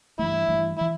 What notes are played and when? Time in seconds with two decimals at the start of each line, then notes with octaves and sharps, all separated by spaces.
0.19 G2 E3 A3 E4
0.49 G2 E3 A3
0.78 E4
0.81 E3